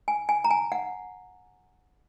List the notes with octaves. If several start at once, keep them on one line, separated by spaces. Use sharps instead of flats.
G#5
G#5
A#5
G#5
F#5